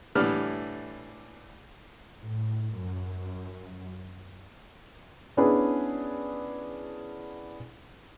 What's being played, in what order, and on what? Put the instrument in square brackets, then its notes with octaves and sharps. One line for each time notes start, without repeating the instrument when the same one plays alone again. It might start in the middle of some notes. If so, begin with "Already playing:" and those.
[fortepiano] A2 D3 E3 G3 D5 F6
[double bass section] A2
F#2
[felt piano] B3 C#4 D4 E4 G#4 B4